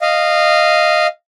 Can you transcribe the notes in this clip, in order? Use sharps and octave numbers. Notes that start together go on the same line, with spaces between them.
D#5 F5